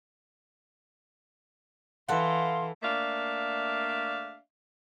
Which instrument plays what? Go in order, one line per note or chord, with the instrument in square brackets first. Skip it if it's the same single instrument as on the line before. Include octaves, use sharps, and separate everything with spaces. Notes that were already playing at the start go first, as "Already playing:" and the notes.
[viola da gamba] E3 [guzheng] A4 F#5 [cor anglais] F5 [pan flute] C6
[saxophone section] A3 A#3 D4 D5 E5 F5